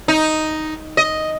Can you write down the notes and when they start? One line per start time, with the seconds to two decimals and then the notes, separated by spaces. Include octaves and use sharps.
0.08 D#4
0.97 D#5